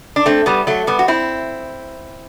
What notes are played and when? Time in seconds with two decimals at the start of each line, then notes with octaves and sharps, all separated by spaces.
0.16 D4
0.26 A3 C4
0.46 G3 B3
0.67 F#3 A3
0.87 G3 B3
0.99 F#4
1.08 C4 E4